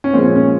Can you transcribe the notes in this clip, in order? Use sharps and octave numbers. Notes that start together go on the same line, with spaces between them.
C#4
A#2 F3 G#3 C4
C#4
C#4